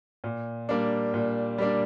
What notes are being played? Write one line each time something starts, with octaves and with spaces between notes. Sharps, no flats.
A#2
G3 A#3 D4
A#2
G3 A#3 D4